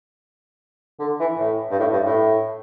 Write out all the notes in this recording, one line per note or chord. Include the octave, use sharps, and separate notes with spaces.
D3
E3
A2
G2
A2
G2
A2